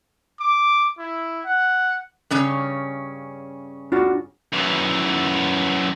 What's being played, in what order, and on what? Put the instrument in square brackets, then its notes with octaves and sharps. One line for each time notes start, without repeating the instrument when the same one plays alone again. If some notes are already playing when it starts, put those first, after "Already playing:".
[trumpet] D6
E4
F#5
[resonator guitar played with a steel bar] G2 C#3 C#4
[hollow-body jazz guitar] D4 F4 F#4
[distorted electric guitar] F#2 E3